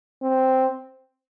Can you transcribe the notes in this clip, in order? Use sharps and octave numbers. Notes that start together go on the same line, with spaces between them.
C4